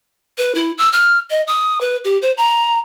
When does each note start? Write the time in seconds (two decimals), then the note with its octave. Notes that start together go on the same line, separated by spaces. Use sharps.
0.38 B4
0.55 E4
0.78 E6
0.92 F6
1.30 D#5
1.47 D#6
1.81 B4
2.05 G4
2.22 C5
2.37 A#5